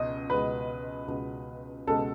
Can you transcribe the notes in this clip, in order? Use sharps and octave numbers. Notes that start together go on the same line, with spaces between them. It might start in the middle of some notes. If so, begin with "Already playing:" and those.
Already playing: C#2 B2 D#5
C#2 B2 G#3 B4
C#2 B2 G#3
C#2 B2 G#3 A4